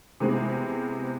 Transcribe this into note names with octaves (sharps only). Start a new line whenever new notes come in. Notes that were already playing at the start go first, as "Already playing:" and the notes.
C3 E3 G#3 B3 C4 G#4